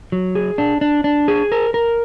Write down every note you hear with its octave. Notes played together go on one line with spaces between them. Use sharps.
F#3
G#4
D4
D4
D4
G#4
A#4
A#4